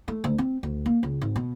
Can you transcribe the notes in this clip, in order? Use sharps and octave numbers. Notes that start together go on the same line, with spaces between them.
A3
D2
C4
D2
A#3
C#2
G#1
B2